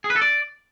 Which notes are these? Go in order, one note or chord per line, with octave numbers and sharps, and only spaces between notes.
G#4
B4
A4
D5